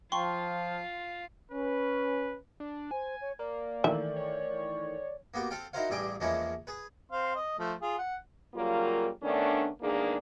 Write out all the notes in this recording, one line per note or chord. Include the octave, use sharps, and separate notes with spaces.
F3 F4 G5 A5 C6 C#6
C#4 B4
D4
C5 G#5
C#5
A#3 D5
D#3 E3 A3 E5
C#5
A#3 B3 F#4 G4
C4 A4 F5 G5
D#4 E4 F#4 A#4 C5 F5
A1 G2 G3 G#4 G5 D6
E2 F3 G#3 A#3 C#4 E4
G#4 B4
C4 F5 C6
D#5
F3 A3
F4 G#4
F#5
C#3 F#3 G3 A#3 F4 A#4
D#3 A3 B3 C#4 D4
E2 G#2 D#3 A#3 D4 G#4